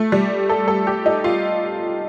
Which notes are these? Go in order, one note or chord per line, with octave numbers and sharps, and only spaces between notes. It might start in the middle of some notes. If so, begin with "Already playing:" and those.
Already playing: A3
G3
A4
A4
G4
D#4
F4